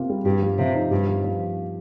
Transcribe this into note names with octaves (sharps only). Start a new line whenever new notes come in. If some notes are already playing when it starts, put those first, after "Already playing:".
Already playing: C3 A#3 F4
G3
G2 G4
F3
C3 F3
D#4
G2 G4
F3
F3